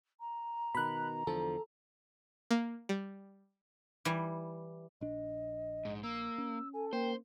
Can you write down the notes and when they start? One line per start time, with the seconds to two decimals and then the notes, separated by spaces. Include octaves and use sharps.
0.20 A#5
0.75 B2 D#3 B5 F#6
1.27 E2 D3 F3 A4
2.51 A#3
2.89 G3
4.05 E3 G3
5.01 A#1 D4 D#5
5.85 G#2
6.03 A#3 E6
6.38 C#4
6.73 A4 G#5
6.93 A#3 C5 G5